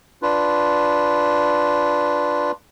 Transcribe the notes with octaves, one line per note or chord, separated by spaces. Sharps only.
D4 F4 B4